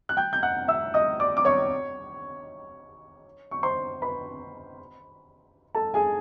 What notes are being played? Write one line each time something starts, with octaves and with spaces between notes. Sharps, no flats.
F#6
G5 G6
G6
F#5 F#6
E5 E6
D#5 D#6
D5 D6
D6
C#5 C#6
C#6
C5 C6
B4 B5
A4 A5
G#4 G#5